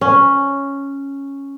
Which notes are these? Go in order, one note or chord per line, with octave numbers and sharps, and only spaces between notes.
C#4